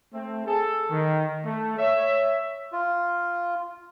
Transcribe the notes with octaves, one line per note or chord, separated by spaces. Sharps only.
A3 C4
G#4 A4
D#3
A3
C#5 E5
F4